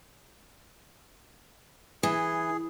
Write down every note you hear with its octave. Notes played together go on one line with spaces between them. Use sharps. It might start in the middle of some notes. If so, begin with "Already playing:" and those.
E3 G#4